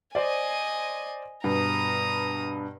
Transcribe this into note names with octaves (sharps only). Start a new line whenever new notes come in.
C5 D5 D#5 G#5
G2 B2 A#5 D#6